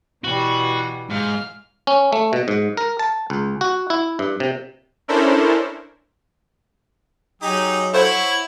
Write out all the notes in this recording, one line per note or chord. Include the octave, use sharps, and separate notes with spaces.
B2 E3 G3 F#4
G#2 F5 F6
C#4
A3
B2
G#2
A#4
A5
C#2
F#4
E4
G2
C3
C#4 D4 E4 A4 A#4 C5
F#3 D#4 G4 G#4 D#6
E4 A4 C5 C#5 F#5 C#6